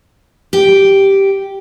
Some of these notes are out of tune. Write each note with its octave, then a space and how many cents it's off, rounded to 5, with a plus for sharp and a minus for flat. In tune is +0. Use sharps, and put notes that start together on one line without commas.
G4 -5